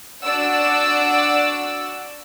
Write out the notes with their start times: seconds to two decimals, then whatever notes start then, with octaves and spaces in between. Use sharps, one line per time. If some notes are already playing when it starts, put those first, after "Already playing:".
0.24 D4 F#4 D5 F#5 E6